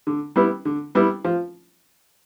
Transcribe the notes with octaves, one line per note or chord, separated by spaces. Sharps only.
D3
G3 B3 E4
D3
G3 B3 E4
F3